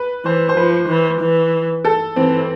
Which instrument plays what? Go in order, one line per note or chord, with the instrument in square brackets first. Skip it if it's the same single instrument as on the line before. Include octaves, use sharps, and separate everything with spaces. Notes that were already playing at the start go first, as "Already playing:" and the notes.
Already playing: [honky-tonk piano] B4
[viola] E3 [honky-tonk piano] C5
[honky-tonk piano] C5
[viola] F3 [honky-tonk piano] B4
[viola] E3
E3
[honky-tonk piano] A4
[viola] E3 [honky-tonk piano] C4